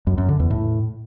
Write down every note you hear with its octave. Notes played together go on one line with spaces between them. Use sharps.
F#2
F#2
D3
E2
A2